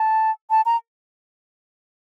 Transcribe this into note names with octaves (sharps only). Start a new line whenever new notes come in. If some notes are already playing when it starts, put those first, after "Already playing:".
Already playing: A5
A5
A#5